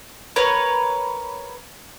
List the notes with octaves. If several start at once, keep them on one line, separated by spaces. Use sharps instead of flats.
A#4 B4 C#5